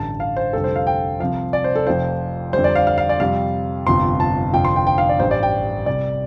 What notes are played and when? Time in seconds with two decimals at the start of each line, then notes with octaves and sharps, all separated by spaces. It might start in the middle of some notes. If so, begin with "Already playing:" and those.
Already playing: A1 G2 D3 A5
0.20 F5
0.37 C5
0.53 F1 F2 D3 G3 A4
0.64 C5
0.76 F5
0.87 G5
1.20 C2 C3 F3 F5
1.53 D5
1.64 C5
1.75 A4
1.87 F1 F2 F3 C5
2.53 F2 D3 G3 C5
2.64 D5
2.75 F5
2.87 F5
2.98 F5
3.09 D5
3.20 F2 C3 G3 F5
3.87 G1 F2 C3 F3 C6
4.20 A5
4.53 F1 F2 D3 F3 G5
4.65 C6
4.76 G5
4.87 G5
4.98 F5
5.09 D5
5.19 A1 G2 G3 C5
5.31 D5
5.43 G5
5.86 C2 C3 G3 D5